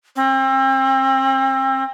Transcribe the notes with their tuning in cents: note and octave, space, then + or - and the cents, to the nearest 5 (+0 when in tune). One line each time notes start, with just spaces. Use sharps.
C4 +35